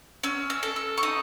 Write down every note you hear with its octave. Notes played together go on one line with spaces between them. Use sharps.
C#4 E6
E6
A4
E6
C#6
D#4 D#6